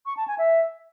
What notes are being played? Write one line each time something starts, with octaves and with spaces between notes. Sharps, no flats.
C#6
A5
G#5
E5